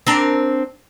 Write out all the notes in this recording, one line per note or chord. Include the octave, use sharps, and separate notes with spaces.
C4 D4 A#4